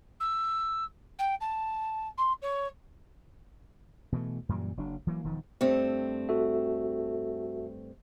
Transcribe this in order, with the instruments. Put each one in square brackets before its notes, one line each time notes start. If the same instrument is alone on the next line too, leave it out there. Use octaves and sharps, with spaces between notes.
[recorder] E6
G5
A5
C6
C#5
[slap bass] B2 E3 G#3 A3
F#2 A#2 E3 G3
F#1 F#3 D4
E3 F#3 A#3
E1 D#3 F3
[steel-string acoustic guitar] G2 A3 C4
[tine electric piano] F#4 A4 E5